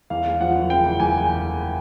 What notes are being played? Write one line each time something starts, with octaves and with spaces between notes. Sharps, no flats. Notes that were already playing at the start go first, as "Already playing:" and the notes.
E2 F5
E2
F3 F#5
F#1
F#1 G5
E2
E2 G#5